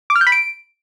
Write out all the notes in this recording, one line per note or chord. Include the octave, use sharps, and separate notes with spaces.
D6
F6
G6
B5
D7